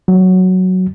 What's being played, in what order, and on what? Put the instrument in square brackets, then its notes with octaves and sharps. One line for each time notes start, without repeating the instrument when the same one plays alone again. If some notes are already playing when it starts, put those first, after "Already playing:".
[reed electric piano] F#3